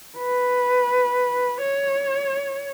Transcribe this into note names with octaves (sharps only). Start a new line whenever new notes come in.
B4
C#5